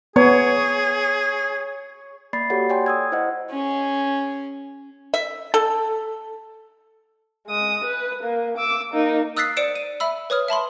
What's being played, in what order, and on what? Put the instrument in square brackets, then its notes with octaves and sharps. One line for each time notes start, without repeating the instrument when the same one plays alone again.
[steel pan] B3 [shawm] G#4 [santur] C#5
[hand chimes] A#3 D5 B5 A6 C7
F#4 G4 A4 C#5 D5 F#5
C#5 D5 G5 G#5 C6
D#6 E6 G#6
E4 C5 D#5 F#5
[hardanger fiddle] C#4 G#4
[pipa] E5
A4
[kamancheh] G#3 D#6
B4
A#3
D6 E6
A#3 D#4
[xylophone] D#6 E6 F#6 A6 B6 C7
C5 D5 C#7 D7 E7
D#7
E5 B5 E6
B4 C#5 D#6 F6
E5 A5 B5 C6